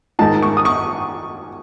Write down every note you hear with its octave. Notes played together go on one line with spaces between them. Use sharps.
G#2 D#3 G#3 D#4 A5
C#6
D#6
C#6